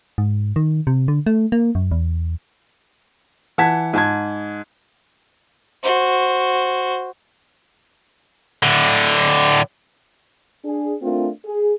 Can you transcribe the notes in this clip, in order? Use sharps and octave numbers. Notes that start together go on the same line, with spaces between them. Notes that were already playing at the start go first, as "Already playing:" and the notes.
G#2
D#3
C3
D3
A3
A#3
F#2
E2
E3 F#5 A5 G#6 B6
G#2 A5 G#6
F#4 C5
A2 D3
D4 G#4
A3 C4 D4 F4 A#4
G#4